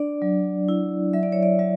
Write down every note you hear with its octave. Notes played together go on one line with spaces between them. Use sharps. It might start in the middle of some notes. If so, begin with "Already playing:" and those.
Already playing: D4 D5
F#3
E4
F#3 E5
D5
C#5
D5
F#3 E5